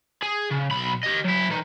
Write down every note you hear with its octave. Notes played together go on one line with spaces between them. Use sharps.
G#4
C#3
B1 B5
G4 D#5
F#3 E4
E3 D#4